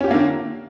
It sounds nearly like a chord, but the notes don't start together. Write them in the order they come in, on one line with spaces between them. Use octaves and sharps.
C#4 G4 F4 A#3 D3